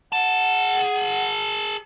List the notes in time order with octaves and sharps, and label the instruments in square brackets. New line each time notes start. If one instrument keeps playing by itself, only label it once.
[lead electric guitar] G#4 A5 [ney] F#5